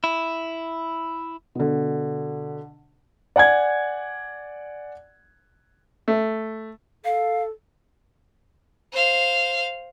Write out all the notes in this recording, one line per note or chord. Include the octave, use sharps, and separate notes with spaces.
E4
B2 D3
D5 F#5 G#5 G#6
A3
A4 F5
C5 F5